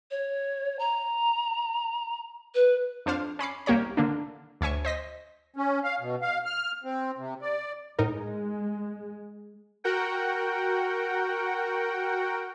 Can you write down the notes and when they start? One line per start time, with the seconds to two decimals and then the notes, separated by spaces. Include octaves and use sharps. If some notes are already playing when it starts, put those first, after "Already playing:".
0.11 C#5
0.79 A#5
2.54 B4
3.06 F2 D4 C5 F5
3.39 C#4 B5 D6 C7
3.66 C2 A#3 G4 C#5 A#5
3.97 D3 A#3 D4
4.61 D2 C#5 E5 G#5 C#6
4.85 C5 D#5 A#6 B6
5.56 C#4
5.84 F5
6.01 B2
6.22 F5
6.45 F6
6.84 C4
7.18 C3
7.42 D5
7.99 A2 G#3 D#4 A#4
9.84 F#4 A#4 F#5 G5